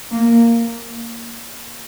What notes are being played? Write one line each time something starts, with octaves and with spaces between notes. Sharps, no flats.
A#3